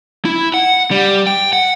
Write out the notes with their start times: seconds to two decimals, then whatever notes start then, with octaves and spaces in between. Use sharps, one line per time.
0.25 E4
0.54 F#5
0.91 G3
1.27 G5
1.53 F#5